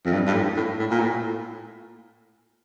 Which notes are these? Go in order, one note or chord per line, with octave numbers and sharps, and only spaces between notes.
F2
G2
G2
A2
A2
A2
A#2
A2